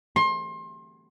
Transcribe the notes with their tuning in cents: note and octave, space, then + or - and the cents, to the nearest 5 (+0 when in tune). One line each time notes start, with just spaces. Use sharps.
C6 +30